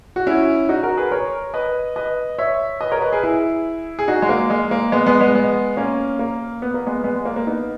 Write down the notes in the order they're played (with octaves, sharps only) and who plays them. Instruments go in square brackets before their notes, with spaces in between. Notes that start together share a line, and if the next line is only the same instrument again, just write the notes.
[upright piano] F#4
C#4 E4
D#4 F#4
F#4 A#4
G#4 B4
A#4 C#5
B4 D#5
B4 D#5
C#5 E5
B4 D#5
A#4 C#5
B4 D#5
G#4 B4
E4 G#4
G#4
D#4 F#4
G#3
A#3
G#3
A#3
G#3 B3
G#3 B3
G#3 B3
G#3 B3
A#3 C#4
A#3
B3
A#3
G#3 B3
G#3 B3
G#3
A#3
A#3
B3 D#4